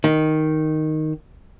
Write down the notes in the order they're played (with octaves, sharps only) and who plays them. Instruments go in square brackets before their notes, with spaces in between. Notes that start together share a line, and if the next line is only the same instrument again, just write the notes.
[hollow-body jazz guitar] D#3